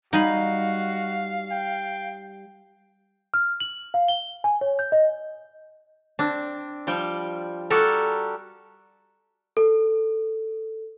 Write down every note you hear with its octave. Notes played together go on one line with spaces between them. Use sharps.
G3 D#4 F#4 F5 G#5 B5
G5
F6
F#7
F5
G7
G#5
C#5
G6
D#5
C4 D4
F3 G3 G5
G3 F#4 G4 A4 A#4
A4